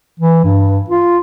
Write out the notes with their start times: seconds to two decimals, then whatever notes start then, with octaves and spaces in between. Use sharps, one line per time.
0.20 E3
0.44 G2
0.90 F4